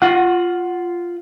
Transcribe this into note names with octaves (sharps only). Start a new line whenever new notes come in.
F4 F#5